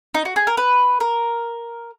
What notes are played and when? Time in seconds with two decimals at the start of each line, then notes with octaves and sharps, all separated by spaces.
0.14 D#4
0.25 F#4
0.36 G#4
0.47 A#4
0.57 B4
1.00 A#4